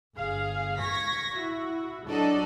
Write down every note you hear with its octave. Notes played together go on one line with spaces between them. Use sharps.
G1 G#4 F5
C#6 G#6 A#6 B6
E4 F#4
F#3 D4 A4 D5 D#5